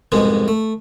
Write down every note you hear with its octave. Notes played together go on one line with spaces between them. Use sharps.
C2 F2 G#2 B2 G#3
A3